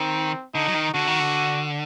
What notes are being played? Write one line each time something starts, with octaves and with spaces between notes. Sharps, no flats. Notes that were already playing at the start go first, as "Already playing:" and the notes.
Already playing: D#3 C4
D3 D#4
F#3
D#3
D3 F#4
D#3
D3